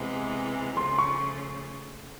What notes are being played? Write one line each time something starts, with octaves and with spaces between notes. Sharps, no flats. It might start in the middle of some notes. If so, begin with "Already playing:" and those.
Already playing: C3 E3 G#3 B3
C#3 F3 A3 C6
C#6